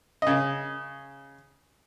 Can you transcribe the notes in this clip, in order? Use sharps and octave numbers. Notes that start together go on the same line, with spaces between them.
C#3 D#5